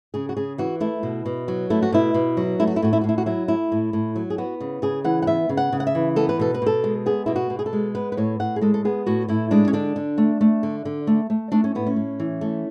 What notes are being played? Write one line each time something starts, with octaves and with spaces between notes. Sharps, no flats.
C#3 G#4
F#4
C#3 G#4
E3 F#4
A3 E4
B2
B2
F#3
A3 E4
F#4
B2 E4
B2
F#3
A3 E4
F#4
E4
A2 F#4
E4
A2 F#4
E4
F#4
F#3 E4
A3 E4
A2
A2
F#3
G#4
B3 F#4
C#3
C#3 G#4
E3 F#5
F#5
B3 E5
C#3
F#5
C#3
F#5
E5
E3
B3 A4
B4
B2 A4
B4
B2 A4
G#3
B3 G#4
B2 E4
F#4
B2
G#4
A4
G#3
B3 B4
B4
A2 C#5
A2 F#5
G#4
G#3 A4
A4
B3 G#4
A2 F#4
A2 E4
G#3 D4
C#4
D3 D4
D3
A3
A3
D3
D3
A3
A3
A3 D4
C#4
A2 B3
C#4
A2
E3
A3